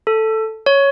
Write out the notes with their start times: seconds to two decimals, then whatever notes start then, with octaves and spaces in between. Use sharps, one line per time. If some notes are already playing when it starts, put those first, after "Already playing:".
0.07 A4
0.66 C#5